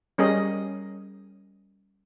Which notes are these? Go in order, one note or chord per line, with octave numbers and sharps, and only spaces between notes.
G3 C#4 G#4 A#4 D#5